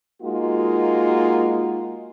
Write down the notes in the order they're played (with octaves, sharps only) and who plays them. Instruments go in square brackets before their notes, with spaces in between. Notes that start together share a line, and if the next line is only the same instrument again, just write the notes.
[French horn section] G#3 A#3 D#4 F4 F#4